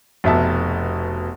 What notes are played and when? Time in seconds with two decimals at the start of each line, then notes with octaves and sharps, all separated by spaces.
0.24 F1 B2 E5 A5